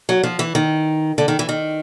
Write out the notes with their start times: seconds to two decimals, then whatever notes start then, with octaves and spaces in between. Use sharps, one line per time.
0.09 F#3
0.23 F3
0.39 E3
0.55 D#3
1.18 D3
1.28 D#3
1.39 E3
1.49 D#3